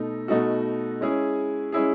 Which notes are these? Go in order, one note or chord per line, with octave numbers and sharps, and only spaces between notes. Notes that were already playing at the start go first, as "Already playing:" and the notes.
Already playing: B2 A3 D#4
B2 A3 D#4 F#4
G#3 C#4 E4 G#4
G#3 C#4 E4 G#4